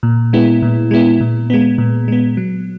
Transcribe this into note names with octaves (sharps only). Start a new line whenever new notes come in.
A#2
G#3 B3 E4
A#2
G#3 B3 E4
A#2
G#3 B3
A#2
G#3 B3
F#3